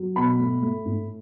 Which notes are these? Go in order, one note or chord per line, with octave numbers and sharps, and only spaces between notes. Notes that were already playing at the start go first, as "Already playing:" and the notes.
Already playing: F#3
B2 B5
A3
A3
A2